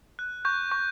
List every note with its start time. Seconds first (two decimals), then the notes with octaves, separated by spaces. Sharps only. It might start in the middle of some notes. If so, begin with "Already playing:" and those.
0.19 F#6
0.45 C#6 G6
0.72 C#6